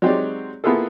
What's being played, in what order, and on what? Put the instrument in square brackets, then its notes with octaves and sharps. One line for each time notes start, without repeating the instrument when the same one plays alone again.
[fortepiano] F#3 G#3 C4 D#4 G4 D5
A#3 B3 E4 F4 G#4 A4